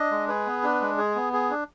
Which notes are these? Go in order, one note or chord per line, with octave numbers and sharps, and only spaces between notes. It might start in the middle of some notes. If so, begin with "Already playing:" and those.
Already playing: D4 D#5
G#3
G#4 B4
B3
D4
G#3
G#4
B3
G#4
D4